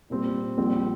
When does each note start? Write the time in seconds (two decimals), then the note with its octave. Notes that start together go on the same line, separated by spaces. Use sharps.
0.10 A#2 G3 C4 G4
0.58 A#1 A#2 G3 C4